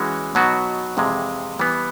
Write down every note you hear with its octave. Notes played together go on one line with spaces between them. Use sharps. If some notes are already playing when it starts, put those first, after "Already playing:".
Already playing: E3 G#3 C#4 F#4
B2 F#3 B3 D#4 F#4
F2 C3 E3 G#3
E3 G3 B3